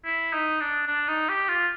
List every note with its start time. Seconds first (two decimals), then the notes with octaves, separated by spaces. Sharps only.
0.05 E4
0.33 D#4
0.60 D4
0.87 D4
1.08 D#4
1.29 G4
1.49 F4